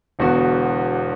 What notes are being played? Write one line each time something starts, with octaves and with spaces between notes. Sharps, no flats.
E1 E2 D3 B3 F#4